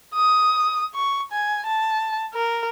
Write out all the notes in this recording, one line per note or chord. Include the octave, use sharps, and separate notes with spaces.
D#6
C#6
G#5
A5
A#4